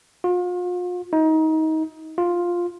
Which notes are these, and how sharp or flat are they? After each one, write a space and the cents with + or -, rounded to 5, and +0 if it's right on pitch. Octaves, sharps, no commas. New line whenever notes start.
F4 +40
D#4 +25
F4 +5